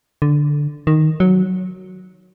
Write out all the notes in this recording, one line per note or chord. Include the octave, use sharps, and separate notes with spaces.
D3
D#3
F#3